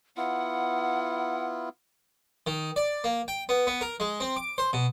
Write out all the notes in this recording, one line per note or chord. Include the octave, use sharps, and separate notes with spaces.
B3 E4 F4 F#5
D#3
D5
A#3
G5
B3
B3
A#4
G#3
C4
D6
C5
B2